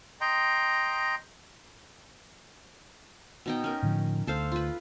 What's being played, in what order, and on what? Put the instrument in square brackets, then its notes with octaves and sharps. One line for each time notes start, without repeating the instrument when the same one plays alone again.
[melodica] D#5 G5 A#5 C6
[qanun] B2 D#4 G5
C#4 A#4
[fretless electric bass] A2 D3 F3
[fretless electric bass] D2 [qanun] A4 C5 F5
[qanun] F4 B4